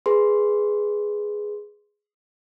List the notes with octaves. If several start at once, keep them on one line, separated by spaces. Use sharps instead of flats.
G#4 B4 C6